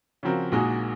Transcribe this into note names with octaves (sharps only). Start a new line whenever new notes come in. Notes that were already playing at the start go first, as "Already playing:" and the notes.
C#3 F3 C4 F#4 A#4
A#1 A#2 G#3 D#4 F#4